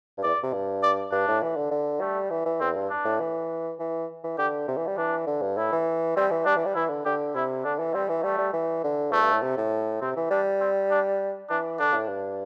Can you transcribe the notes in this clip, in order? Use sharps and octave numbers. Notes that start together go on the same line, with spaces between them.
G2
E2 D5
C3
G2
D5
G2 D4
A2
E3
D3
D3
G3 A3
E3
E3
E2 C4
G2
D4
A2
E3
E3
E3
D3 G4
C3
E3
G3
E3 D4
D3
G2
A2 E4
E3
G3 C4
E3
G3 D4
E3
G3
E3 E4
D3
D3 G4
C3 E4
D3 D4
E3
G3 C4
E3
G3 A3
G3
E3
D3
E2 A3
G2
A2
C3
A2
C3 C4
E3
G3 D4
C4
D4
E3 D4
D3 D4
A2
G2